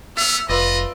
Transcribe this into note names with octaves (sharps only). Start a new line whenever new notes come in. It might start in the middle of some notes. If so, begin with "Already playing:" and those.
B3 E5 E6 F6
F1 F4 B4 D5 D#5